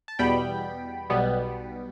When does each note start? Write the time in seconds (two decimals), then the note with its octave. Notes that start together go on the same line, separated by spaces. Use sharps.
0.08 A5
0.19 E2 B2 G3 B3 G5 B5
1.10 B1 B2 G3 B3